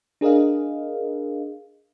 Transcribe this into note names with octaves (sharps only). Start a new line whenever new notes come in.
D4 G#4 A#4 D#5 F5